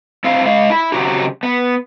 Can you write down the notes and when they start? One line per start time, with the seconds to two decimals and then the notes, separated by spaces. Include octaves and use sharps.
0.24 C4 E4 F5
0.45 G#3 F5
0.70 E4
0.92 C#3 E3 F#3 C4 F#4 G4
1.43 B3